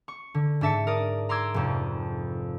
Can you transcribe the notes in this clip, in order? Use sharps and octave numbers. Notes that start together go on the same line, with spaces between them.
C#6
D3
G#2 D4 E5 A5 C#7
A#4 D5 D#6
A#5 C6 D6 E6 G#6
F1 F2